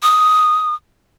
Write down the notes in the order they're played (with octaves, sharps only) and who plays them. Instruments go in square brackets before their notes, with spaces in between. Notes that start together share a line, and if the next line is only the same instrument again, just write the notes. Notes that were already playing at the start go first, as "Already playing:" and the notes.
[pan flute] D#6